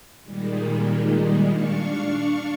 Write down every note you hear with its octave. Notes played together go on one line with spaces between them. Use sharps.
A#2 D#3 G3 G#3
D4 F5 C#6 C#7